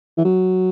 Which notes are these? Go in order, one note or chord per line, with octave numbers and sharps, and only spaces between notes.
E3
F#3